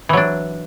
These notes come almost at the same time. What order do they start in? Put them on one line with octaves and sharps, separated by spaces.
E3 F#3 D4